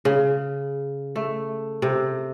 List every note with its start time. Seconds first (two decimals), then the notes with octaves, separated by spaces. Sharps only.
0.05 C#3
1.16 A3
1.82 C3